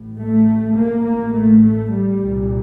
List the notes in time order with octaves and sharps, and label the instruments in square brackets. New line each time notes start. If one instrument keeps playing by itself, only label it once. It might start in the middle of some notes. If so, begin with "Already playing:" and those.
Already playing: [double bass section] A1 A2
A3
A#3
A1 A2 A#3
A3
A3
G3
C2 A#2